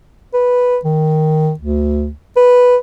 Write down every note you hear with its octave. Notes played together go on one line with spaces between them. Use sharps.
B4
D#3
D2
B4